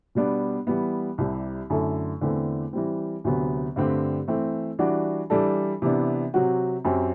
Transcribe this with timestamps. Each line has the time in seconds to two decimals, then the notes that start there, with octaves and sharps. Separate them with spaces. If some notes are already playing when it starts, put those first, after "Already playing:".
0.15 B2 G3 B3 D4
0.67 E3 G3 B3
1.18 C2 C3 G3
1.70 F#2 D3 A3 E4 A4
2.21 E2 D3 A3 C4 E4
2.73 E3 G3 C4
3.24 D2 C3 F#3 B3
3.76 G2 D3 A3 C4 G4
4.28 E3 A3 C4
4.79 E3 G3 D4 F#4
5.30 E3 G3 D4 A4
5.82 C3 E3 B3 D4
6.34 C3 F#3 C4 F#4
6.85 F#2 F#3 C4 G4